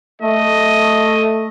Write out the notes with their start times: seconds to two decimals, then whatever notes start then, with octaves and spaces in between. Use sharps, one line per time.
0.22 A3 D#5